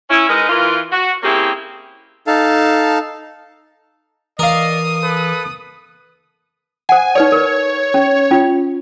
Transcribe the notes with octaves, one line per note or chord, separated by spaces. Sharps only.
C#4 E4
G#3 D#4 A#4 B4 D#5
E3 F4 A#4
F#4
A#3 C4 C#4 E4 G4 G#4
D#4 A4 F5 A5
E3 A#4 D5 D#5 F5 D#6
A4 B4
C5 F#5 G#5
D#4 B4 C#5 D5
A#4 B4
C#4
C#4 F4